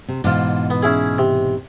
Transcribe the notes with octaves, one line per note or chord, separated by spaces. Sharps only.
C3
G#2 B2 E3 D4 F4
B3
C#4 E4 G#4
C3